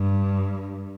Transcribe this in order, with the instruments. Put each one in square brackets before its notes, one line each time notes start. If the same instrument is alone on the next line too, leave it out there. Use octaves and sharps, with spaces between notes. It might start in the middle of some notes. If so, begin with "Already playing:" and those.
Already playing: [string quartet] G2